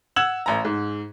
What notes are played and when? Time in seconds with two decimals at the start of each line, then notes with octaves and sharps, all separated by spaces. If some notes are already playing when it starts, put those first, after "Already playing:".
0.16 F#5 E6 G#6 E7 F#7
0.46 A1 A#5
0.65 G#2